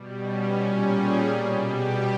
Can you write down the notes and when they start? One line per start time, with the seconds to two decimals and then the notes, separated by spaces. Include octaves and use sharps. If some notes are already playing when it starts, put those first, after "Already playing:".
Already playing: B2 G3
0.24 C#4
0.59 A#2 G3 C#4
0.94 G#4
1.27 B2 G3
1.61 G4